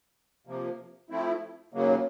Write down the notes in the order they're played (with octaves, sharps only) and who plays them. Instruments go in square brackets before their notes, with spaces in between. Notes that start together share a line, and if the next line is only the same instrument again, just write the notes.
[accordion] C3 F3 A#3
F3 A3 C4 E4
D#2 C#3 F#3 A#3